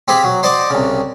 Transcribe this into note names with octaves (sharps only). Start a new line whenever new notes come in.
C4 G4 G#4 F5 B5
F#3
C5 D5 D#5 F#5 D6
C2 C#3